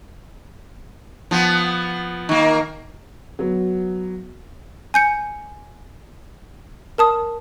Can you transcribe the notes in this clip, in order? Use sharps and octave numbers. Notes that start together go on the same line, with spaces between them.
F3 B3
D#3 A#3
F#3 B3
G#5 G6 C#7
A#4 A5 D#6